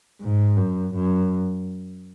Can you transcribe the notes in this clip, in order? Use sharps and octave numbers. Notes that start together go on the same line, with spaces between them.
G#2
F#2
F#2